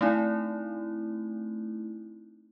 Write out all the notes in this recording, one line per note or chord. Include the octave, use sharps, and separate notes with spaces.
A3 C4 D#4 E4